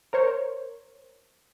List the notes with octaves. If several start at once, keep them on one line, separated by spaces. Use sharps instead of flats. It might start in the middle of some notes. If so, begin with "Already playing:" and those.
A#4 C5 C#5